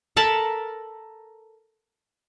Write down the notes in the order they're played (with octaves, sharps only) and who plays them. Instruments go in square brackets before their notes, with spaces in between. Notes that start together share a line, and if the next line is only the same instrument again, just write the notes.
[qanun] A4 A#4 A5 B5